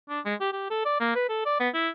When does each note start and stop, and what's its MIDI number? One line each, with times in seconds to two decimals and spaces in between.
0.09 0.20 62
0.25 0.34 56
0.40 0.50 67
0.52 0.66 67
0.70 0.82 69
0.85 0.96 74
1.00 1.11 58
1.15 1.26 71
1.29 1.45 69
1.45 1.60 74
1.60 1.68 59
1.74 1.89 64